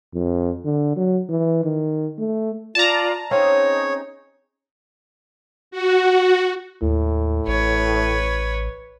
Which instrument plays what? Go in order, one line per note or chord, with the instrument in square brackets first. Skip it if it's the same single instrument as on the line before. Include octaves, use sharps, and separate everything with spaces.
[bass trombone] F2
D3
F#3
E3
D#3
A3
[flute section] F4 D5 [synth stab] A5 A#5
[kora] C4 C#4 F5 [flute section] D#4 G#4 [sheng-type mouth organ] C#5
[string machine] F#4
[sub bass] D#2 [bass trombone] A2
[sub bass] A1 [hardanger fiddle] B4 C#5